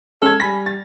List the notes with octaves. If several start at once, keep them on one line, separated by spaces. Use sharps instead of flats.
G#3 C#4 A4 F6 G#6
G3 G#5 B5 A#6 B6
A6